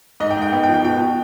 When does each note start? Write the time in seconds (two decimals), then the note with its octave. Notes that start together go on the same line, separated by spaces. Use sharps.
0.20 G#2 D#5
0.31 G5
0.37 G#2
0.42 G5
0.52 B3
0.63 G5
0.68 F3
0.74 G5
0.85 B2 G5
1.01 B2